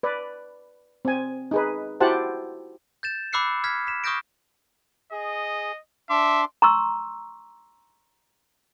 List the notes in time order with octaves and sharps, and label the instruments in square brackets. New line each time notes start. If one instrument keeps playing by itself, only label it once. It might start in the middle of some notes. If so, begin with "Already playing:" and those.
[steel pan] B4 D5
C4 G#5
D#4 G#4 B4
E4 F#4 G4 C5 F#5 A5
[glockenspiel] G6 A6 E7
B5 D6 E6 F#6 C7 C#7
F6 G#6 B6
B6 E7
C#6 D#6 F6 G6 A#6 D7
[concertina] G#4 [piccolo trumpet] D#5
[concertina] D4 C6 D6 [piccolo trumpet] E5
[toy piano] A#5 C6 C#6 E6